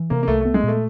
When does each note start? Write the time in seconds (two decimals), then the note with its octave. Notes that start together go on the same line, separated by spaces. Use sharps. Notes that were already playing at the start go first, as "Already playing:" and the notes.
Already playing: E3
0.10 C3 A#3
0.23 A#3
0.28 C2 A3
0.41 A3 B3
0.54 G#3
0.63 A#2 A3